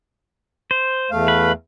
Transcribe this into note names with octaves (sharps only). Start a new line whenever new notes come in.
C5
E2 A3 F5
B4